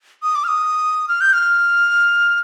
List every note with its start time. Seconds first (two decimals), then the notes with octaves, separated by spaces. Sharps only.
0.23 D#6
0.35 D6
0.44 F6
0.48 D#6
1.08 F6
1.21 G6
1.33 F6